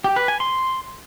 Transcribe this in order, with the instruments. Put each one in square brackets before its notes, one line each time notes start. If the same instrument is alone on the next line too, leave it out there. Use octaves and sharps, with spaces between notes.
[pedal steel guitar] G4
B4
G#5
C6